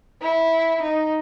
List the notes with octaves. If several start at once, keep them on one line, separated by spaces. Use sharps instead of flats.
E4
D#4